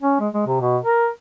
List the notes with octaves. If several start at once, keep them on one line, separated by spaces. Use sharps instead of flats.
C#4
G#3
G#3
C3
B2
A#4